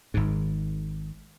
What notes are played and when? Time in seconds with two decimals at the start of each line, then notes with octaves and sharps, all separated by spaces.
0.14 G#1 G#2